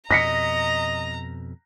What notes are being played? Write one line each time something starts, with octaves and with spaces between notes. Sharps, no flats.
F2 B2 D#5 A#5 A#6 B6 C#7